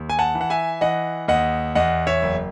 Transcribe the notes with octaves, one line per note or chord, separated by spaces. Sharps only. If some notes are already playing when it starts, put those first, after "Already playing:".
Already playing: D#2
G#5
F#5 A5
E3
F#5
E5 G#5
E3 D#5 F#5
D#2 D#5 F#5
E2 D#5 F#5
C#5 E5
F#1